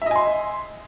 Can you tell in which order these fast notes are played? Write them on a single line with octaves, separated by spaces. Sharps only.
E5 D#5 G#5 C6